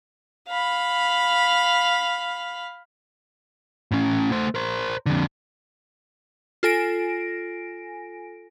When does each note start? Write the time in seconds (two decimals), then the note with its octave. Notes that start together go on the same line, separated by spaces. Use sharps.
0.49 F5 B5
3.92 A2 C#4
4.32 A3 C5
4.55 A#4 C5
5.06 F2 D3
6.63 F4 A4 G#5 A#6 D7